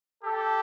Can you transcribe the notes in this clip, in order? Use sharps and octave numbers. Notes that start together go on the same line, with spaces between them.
G4 A4